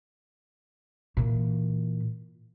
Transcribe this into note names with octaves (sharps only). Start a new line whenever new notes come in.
A#2 E3